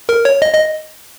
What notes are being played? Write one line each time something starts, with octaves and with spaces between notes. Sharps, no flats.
A#4
C#5
D#5
D#5